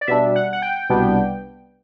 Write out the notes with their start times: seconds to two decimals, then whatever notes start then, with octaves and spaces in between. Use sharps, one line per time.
0.01 D5
0.07 B2 G3 D4 E5
0.36 F#5
0.53 F#5
0.62 G5
0.89 C2 B2 G3 B3 D4